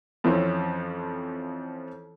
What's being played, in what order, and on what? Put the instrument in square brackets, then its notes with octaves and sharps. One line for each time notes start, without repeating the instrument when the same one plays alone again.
[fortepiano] F2 E3 F3 C4 C#4